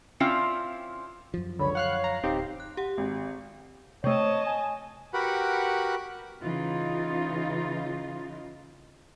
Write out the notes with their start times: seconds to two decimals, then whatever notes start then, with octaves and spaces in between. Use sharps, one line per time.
0.20 C4 C#4 E4 F4 D5
1.34 F#2 F3
1.59 C#2 D3 C#5 B5
1.75 F5 F#5 F6 F#6
2.04 A#5
2.23 D1 C4 D#4 G4
2.60 F#6
2.77 G4 F#5
2.98 G#1
4.04 C3 A3 C#5 D#5 A5
4.46 G#5
5.14 F#4 G4 A#4 B4 F#5 B5
6.43 C#3 E3 D#4 F4